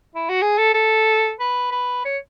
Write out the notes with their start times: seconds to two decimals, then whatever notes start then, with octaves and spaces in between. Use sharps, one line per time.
0.15 E4
0.29 F#4
0.42 G#4
0.58 A4
0.74 A4
1.40 B4
1.72 B4
2.05 C#5